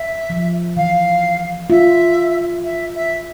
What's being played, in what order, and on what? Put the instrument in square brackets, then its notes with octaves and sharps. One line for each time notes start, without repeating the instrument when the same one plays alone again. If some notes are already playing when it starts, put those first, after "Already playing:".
Already playing: [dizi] E5
[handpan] F3
[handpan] E3 [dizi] F5
[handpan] F4 [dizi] E5
[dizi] E5
E5